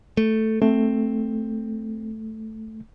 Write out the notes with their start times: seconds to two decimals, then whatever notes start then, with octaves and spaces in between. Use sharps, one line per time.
0.17 A3
0.62 A3 C4